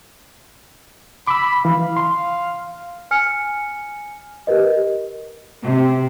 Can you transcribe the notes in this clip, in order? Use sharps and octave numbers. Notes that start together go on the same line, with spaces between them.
B5 D6 E6
E3 F5
C6
G#5 F6 C#7
G4 A#4 B4 D#5
C3